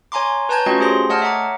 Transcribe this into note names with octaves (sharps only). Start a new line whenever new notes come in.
C#5 G#5 A#5 C6 D6
B4 C#5 A5 A#5 G6 G#6
A3 C#4 F4 F#4 D#5 G5
A3 G4 G#4 C5 C6 A#6
A3 C#5 D#5 F#5 A5 F6
E5 F#5 A#5 D6